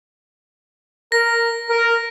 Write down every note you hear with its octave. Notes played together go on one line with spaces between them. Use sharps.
A#4 A#6
A#4